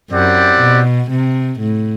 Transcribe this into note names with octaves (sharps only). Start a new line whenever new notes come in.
F#2 C4 E4 G4 D5 F#5
B2
C3
A2